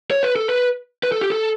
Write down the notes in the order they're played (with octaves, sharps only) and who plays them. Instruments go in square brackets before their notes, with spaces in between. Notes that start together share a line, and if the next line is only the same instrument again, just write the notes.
[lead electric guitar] C#5
B4
A4
B4
B4
A4
G4
A4